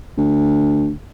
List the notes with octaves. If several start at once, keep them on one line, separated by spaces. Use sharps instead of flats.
D2